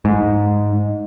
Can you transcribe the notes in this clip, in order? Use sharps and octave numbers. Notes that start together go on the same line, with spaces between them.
G#2